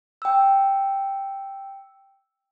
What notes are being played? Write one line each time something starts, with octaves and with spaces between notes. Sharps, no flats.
G5 E6